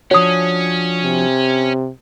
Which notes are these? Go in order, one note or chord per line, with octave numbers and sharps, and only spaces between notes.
F3 C#4 D4 F#4 C#5 D#6
C3